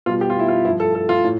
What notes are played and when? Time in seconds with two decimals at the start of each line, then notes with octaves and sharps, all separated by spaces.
0.06 B2 G3 F4
0.21 G4
0.30 F4
0.39 E4
0.48 F4
0.65 G2 F3 E4
0.80 A4
0.95 A4
1.09 F4
1.24 A2